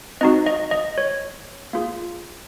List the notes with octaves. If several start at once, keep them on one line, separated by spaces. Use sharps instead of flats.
C4 D#4 F#4 D#5
D#5
D#5
C#5
A#3 F4 G#4